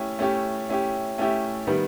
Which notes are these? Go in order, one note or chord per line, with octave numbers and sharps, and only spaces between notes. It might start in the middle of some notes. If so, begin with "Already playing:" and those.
Already playing: A3 C#4 E4 G4
A3 C#4 E4 G4
A3 C#4 E4 G4
A3 C#4 E4 G4
D#3 G3 B3